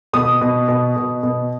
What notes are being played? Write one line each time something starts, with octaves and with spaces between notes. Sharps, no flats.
B2 D#6
B2
B2
B2
B2